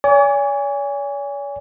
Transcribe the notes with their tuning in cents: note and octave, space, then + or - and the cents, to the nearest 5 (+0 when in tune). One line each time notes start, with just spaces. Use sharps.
C#5 +45 G#5 -20 D6 -40